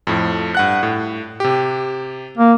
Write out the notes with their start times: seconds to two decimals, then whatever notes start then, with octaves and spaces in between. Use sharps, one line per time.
0.07 F2 A2 F3
0.55 G2 F#5 F#6
0.83 A2
1.40 C3 G4
2.38 A#3